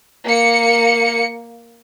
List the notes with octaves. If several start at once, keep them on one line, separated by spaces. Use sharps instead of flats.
A#3 C#7